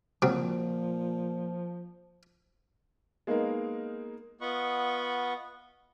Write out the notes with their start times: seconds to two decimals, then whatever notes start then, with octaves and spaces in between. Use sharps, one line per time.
0.22 A#2 C#3 F3 F#3 C4
3.27 G#3 A#3 B3 D#4 A#4
4.41 B3 F4 D#5 F#5 B5 C#6